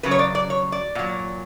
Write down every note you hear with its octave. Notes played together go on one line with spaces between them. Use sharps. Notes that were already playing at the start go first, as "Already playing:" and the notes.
C#3 F#3 B4
C#5
D5
D5
C#5
D5
A#2 F#3